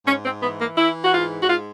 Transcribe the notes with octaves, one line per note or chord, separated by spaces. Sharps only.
G#2 C#4
C4
E3 B3
A#3
E3 E4
F#4
G#2 F4
F#4
G#3 F4